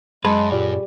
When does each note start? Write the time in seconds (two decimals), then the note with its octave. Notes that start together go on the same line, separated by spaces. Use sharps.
0.25 F#2 G#3 G#4 B4 D#5 A5 C6
0.52 A#2 G4 D5